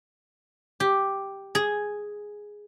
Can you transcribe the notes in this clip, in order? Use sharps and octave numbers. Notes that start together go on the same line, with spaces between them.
G4
G#4